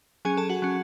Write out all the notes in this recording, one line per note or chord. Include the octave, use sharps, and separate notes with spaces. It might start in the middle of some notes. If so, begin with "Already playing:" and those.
F#3 C#4 G#4 G#5
A4 A5
F#4 F#5
F#3 C#4